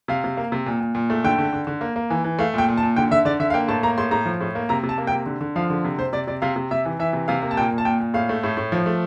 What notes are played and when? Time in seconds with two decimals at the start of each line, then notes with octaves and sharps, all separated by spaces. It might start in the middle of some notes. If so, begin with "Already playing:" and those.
0.08 C3 F5
0.24 C3
0.37 A#3
0.52 C3
0.66 A#2
0.81 A#2
0.95 A#2
1.10 A3
1.24 D3 G5
1.38 D3
1.53 D3
1.67 D3
1.81 A#3
1.96 A#3
2.10 E3
2.24 E3
2.39 A3 F5
2.54 A#2 G5
2.68 A#2
2.78 A5
2.83 A#2
2.96 D3 G5
3.11 D3 E5
3.25 D3 D5
3.40 D3 E5
3.50 F5
3.54 A#3 G5
3.68 A2 A5
3.83 A#3 A#5
3.98 A2 C6
4.11 A2 A#5
4.25 F3
4.41 A2
4.55 A#3
4.69 C3 A#5
4.83 C3
4.89 A5
4.98 A#3
5.07 G5
5.12 C3
5.26 D3
5.41 D3
5.56 F3 F5
5.70 D3
5.84 C3
5.98 C3 C5
6.13 C3 D5
6.27 C3 D5
6.42 C3 F5
6.56 C3
6.71 C3 E5
6.85 E3
6.99 E3 E5
7.13 C3
7.28 C3 F5
7.42 A#3
7.51 A5
7.57 A#2 G5
7.71 A#2
7.78 A5
7.85 A#2 G5
8.00 A#2
8.14 A2 F5
8.29 A3
8.44 A2
8.57 A2
8.72 F3
8.86 A3